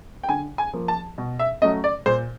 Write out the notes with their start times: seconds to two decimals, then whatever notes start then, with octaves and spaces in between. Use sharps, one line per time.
0.23 G5
0.29 D3 G#5
0.58 G#5
0.73 F3 A#3
0.88 A5
1.18 B2
1.39 E5
1.62 F#3 A3 C#4 D#5
1.84 D5
2.06 A#2 C5